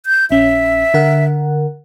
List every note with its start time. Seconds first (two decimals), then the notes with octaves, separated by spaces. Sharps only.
0.06 G6
0.31 A#1 C#4 E5
0.94 D3 A#4 F#5